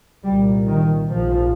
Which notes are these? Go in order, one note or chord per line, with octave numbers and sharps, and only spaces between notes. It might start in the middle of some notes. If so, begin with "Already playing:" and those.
C2 A#2 G3
D#3
A#1 G#2 F3